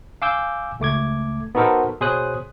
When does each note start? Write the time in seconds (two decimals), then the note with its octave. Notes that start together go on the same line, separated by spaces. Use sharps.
0.22 F5 G#5 D6 E6 G6
0.80 C#2 A3 D6 G#6
1.55 B3 D#4 F#4 A4 A#4 C5
2.01 B2 G#4 C5 C#5 D#6 F#6